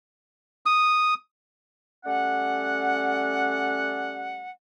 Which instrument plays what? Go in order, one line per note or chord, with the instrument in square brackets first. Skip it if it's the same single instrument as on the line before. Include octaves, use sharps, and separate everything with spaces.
[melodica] D#6
[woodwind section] G3 A3 C#4 D5 F#5